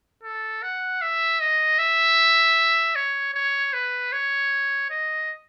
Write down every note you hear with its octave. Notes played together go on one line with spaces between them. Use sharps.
A4
F#5
E5
D#5
E5
C#5
C#5
B4
C#5
D#5